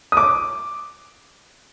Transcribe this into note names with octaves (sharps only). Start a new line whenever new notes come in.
D#6
D6